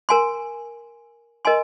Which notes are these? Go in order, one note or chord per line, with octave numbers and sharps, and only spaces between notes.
A#4 G#5 C6
A#4 D#5 G#5 C6